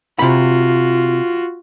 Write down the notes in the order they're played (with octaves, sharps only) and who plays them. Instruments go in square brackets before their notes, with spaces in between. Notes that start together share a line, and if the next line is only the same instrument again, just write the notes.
[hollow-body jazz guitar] C3 B5 [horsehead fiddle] F4 F#4